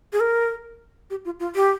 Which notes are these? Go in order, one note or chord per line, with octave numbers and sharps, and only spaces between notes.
G#4
A#4
G4
F4
F4
G4